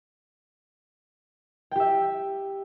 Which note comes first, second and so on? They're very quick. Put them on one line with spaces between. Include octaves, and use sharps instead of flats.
G5 G4 E5